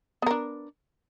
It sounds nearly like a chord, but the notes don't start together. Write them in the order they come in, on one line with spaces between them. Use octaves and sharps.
B3 A#4 D4